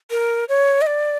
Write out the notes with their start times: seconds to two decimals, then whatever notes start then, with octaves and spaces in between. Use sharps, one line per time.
0.11 A#4
0.49 C#5
0.82 D#5
0.87 D5